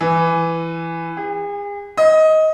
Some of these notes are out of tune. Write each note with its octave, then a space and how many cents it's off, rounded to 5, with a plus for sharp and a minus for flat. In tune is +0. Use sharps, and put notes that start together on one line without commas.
E3 +10
G#4 -40
D#5 +15